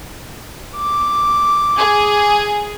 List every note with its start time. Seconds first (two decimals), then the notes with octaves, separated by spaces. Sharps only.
0.77 D6
1.78 G#4